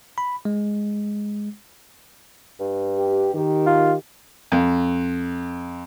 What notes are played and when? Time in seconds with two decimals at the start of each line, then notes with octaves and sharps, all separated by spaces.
0.18 B5
0.45 G#3
2.60 G2
2.98 G4
3.35 D#3 G4
3.67 F4
4.52 F2